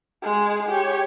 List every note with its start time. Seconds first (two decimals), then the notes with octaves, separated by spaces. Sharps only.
0.23 G#3 G#4
0.69 G4 C#5